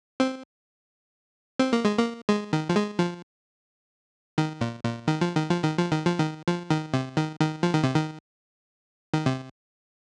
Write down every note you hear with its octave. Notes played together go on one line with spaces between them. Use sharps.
C4
C4
A#3
G#3
A#3
G#3
D#3
F3
G#3
F3
D#3
A#2
A#2
D#3
F3
D#3
F3
D#3
F3
D#3
F3
D#3
F3
D#3
C3
D#3
D#3
F3
D#3
C3
D#3
D#3
C3